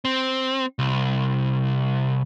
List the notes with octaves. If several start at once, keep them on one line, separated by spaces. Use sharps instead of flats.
C4
C2